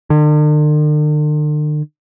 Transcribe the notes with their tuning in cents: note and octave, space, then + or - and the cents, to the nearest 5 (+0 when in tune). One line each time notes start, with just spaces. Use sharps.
D3 +45